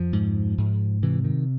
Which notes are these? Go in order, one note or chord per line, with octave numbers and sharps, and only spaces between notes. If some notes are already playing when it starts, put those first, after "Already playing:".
Already playing: F2 F3
G#2
G#2
C3 E3
D#3